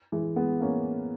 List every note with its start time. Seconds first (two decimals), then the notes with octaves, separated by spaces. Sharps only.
0.12 E3 G#3
0.36 G#3 B3
0.60 A#3 C#4